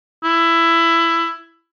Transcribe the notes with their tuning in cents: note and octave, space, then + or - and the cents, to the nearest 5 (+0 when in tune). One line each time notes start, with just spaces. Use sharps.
E4 +15